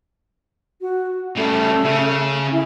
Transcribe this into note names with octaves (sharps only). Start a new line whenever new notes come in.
F#4
C#3 G3 A3
C#3
E4